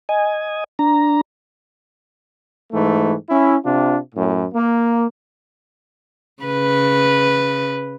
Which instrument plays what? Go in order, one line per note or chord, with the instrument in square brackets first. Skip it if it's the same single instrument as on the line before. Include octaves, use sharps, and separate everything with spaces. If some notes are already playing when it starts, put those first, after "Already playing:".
[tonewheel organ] D#5 G#5
D4 A#5
[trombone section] G#2 E3 A3
C#4 E4
C3 D4 F4
F#2 A2
A#3
[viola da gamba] C#3 B4